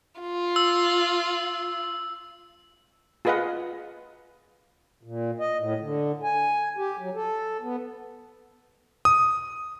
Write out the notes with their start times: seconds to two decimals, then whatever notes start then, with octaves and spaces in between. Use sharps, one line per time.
0.20 F4
0.56 E6
3.25 F4 G#4 B4 D#5 F5 F#5
5.03 A#2
5.40 D#5
5.58 A2
5.80 D3
6.23 G#5
6.77 G4
6.99 F#3
7.15 A4
7.61 B3
9.05 D#6